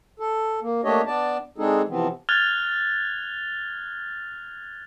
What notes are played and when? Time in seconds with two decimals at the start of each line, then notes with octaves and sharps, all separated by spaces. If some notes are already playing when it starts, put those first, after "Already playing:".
0.20 A4
0.62 A#3
0.84 A3 A#3 D4 G4 C#5 D#5
1.07 B3 D4 D5 A5
1.58 G#3 C4 D4 D#4 G#4 A4
1.89 C3 E3 F3 B3 C4
2.29 F6 F#6 G#6 A6 F7 G7